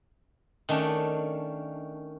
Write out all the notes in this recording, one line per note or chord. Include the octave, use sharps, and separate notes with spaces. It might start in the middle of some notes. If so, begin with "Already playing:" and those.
D#3 A3 C#4 D4